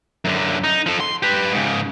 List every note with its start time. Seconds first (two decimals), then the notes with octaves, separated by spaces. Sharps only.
0.25 F#2 D3
0.64 D#4
0.86 F3 A4
1.00 C6
1.23 G4 B4
1.52 G#2 C#3